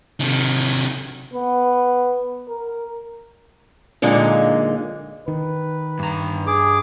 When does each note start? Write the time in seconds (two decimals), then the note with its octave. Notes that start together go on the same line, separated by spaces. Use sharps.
0.20 C3 D#3
1.33 B3
2.49 A#4
4.02 F#2 A#2 D3 G#3 A#3 D#4
5.28 D#3 B4
5.99 G2 A#5
6.47 G#4 D6